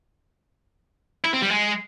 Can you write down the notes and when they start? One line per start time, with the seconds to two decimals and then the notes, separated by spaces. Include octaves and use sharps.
1.24 E4
1.33 C4
1.42 G3
1.51 G#3